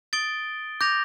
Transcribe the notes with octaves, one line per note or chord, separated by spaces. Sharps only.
D#6 A6 D7 G7
D6 G6 A#6 F7